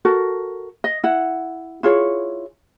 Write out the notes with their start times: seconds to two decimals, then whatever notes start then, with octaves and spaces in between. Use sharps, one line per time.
0.05 F#4 A4 A#4
0.84 D#5
1.04 E4 F#5
1.83 E4 F4 G#4 C#5